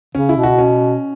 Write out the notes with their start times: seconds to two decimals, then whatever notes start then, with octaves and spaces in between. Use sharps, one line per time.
0.15 C#3 C#4
0.29 E4
0.36 B2
0.43 F#4
0.58 C#4